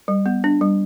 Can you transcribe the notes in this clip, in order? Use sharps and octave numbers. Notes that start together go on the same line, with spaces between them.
G3
B3
D4
G3